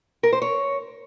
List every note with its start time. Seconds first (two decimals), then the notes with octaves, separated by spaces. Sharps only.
0.23 A#4
0.32 C5
0.42 C#5